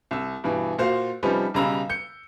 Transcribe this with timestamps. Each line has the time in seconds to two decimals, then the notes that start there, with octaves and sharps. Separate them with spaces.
0.11 C2 E6
0.44 G2 B2 E3
0.78 A#2 F#4 C5 F5
1.23 C3 F3 G3 C#4 D#4 B4
1.54 B1 C#3 G3 A#5 B5 E6
1.90 G6 C#7